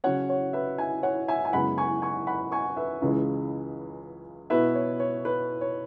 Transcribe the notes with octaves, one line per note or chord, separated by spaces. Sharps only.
C#3 F#3 C#4 C#5 F#5
C#5
B4 E5
E5 G#5
C#5 F#5
E5 G#5
G#5
F#2 C#3 G#3 B3 E4 F#5 B5
G#5 C#6
G#5 C#6
F#5 B5
G#5 C#6
B4 E5
C#2 C#3 E3 G#3
B2 B3 E4 B4 E5
C#5
C#5
B4
C#5